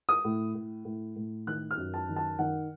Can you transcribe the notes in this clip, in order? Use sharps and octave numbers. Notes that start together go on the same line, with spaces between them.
D#6
A2
A2
A2
A2
D#3 F#6
F6
F#2
A5
D#3
A5
D#3 F#5